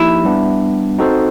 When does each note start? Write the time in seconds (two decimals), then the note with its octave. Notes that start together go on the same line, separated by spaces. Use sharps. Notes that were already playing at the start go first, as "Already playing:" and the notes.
Already playing: F3 A#3 D#4 E4 G4
0.24 G3 B3 D4
0.98 C4 D#4 F#4 A4 C5